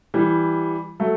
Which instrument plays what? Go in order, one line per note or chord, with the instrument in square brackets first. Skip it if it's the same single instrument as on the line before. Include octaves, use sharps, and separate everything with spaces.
[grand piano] E3 G3
F#3 A3